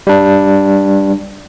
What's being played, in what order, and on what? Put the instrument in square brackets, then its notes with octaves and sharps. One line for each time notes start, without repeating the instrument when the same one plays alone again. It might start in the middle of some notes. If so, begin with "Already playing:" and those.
[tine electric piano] G3 D4